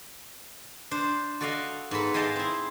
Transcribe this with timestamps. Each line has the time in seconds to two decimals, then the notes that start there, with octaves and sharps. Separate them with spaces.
0.91 D4 C5
1.41 F#4 A4 D5 D#5 F5
1.91 G#2 B3 A4 B5
2.14 G#4 D#5 F5 G5 A5
2.36 C4 E4